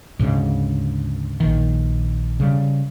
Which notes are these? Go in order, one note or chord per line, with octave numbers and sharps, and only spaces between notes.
D2 G#2 C#3
A#1 D#3
C#3 G3